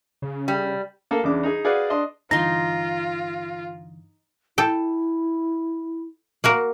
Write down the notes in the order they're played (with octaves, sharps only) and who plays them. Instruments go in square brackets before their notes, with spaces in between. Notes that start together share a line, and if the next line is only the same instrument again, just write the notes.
[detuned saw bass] C#3
[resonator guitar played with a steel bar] G3
[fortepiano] A#3 A4
E2 C#3 D4 D6
D#4 G#4
F#4 G#4 B4 D5 F5 F#5
D4 D#5 C6
[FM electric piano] G2 D3 E3 [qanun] D#4 C6 [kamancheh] F4 [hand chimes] A#6
[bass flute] E4 [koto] A4 G5
[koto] A#3 F#4 A#4